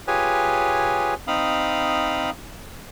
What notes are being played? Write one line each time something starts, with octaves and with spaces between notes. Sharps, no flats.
F4 G4 G#4 B4 C#5 G#5
C4 D#4 F5 B5 D#6